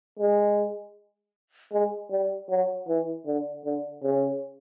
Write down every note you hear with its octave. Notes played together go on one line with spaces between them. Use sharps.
G#3
G#3
G3
F#3
E3
D3
D3
C#3